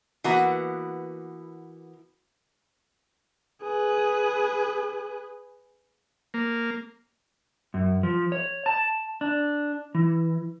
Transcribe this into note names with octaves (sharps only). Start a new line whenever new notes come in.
E3 A#3 B3 F#4
G#4 B4
A#3
F#2
F3
C#5
A5
D4
E3